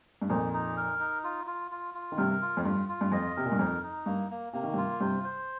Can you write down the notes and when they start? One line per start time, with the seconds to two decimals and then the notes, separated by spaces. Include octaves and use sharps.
0.22 G2
0.29 F2 A#2 D#4
0.53 D#4
0.77 A#4
1.00 D#4
1.24 F4
1.47 F4
1.71 F4
1.94 F4
2.12 D#3
2.17 G2 C3 A#4
2.42 F4
2.57 F2
2.65 G2 F4
2.89 F4
3.01 G2
3.12 F2 D#5
3.36 C3 A#4
3.45 A#2
3.52 G2
3.59 F2 D#4
3.83 D#4
4.06 G2 A#3
4.30 A#3
4.53 C3 A#3
4.63 D#3
4.73 G2 C3
4.78 F4
5.00 G2 C3 C5
5.24 C5